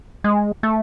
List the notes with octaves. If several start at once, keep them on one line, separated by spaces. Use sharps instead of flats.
G#3
A3